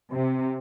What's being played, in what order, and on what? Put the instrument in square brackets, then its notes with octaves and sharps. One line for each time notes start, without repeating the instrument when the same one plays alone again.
[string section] C3